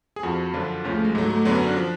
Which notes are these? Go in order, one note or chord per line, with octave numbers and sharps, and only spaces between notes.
G#4
F2 F3 F#4
F#2 D3 F3 F4
D2 C#3 F3 C#4
A3
G#3
G#2 F#3 A3
A3
F#2 D3 F#3 B3
C#4
D4
F3